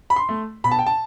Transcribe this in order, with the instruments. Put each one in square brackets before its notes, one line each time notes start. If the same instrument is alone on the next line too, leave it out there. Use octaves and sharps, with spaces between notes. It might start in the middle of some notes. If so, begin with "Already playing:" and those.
[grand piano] B5
C6
A3
B2 B5
A5
G5
A5